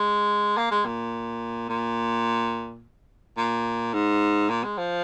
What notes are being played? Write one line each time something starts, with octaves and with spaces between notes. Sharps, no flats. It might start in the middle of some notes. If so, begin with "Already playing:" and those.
Already playing: G#3
A#3
G#3
A#2
A#2
A#2
G#2
A#2
G#3
F3